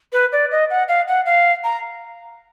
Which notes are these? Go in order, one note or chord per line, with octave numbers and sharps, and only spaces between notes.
B4
D5
D#5
F#5
F5
F#5
F5
A#5